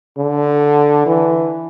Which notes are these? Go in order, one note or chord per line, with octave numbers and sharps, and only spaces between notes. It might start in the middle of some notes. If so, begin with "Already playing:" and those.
D3
E3